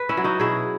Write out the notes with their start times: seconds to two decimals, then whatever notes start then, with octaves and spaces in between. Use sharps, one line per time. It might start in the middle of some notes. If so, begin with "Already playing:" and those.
Already playing: B4
0.09 C#4 E4
0.17 F#3
0.24 D#4 F#4
0.40 B2 E4 G#4